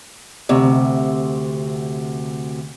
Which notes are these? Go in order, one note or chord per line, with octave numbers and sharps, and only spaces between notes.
D2 C3